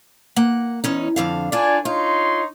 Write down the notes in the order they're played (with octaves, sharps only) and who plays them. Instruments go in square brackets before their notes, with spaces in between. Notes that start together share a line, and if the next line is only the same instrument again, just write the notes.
[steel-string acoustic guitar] A#3 F#5
E2 C#4 D#4
F2 D3 F5
[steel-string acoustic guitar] D4 F4 [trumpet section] D5 G#5
[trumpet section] D#4 C#5 C6 [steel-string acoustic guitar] F4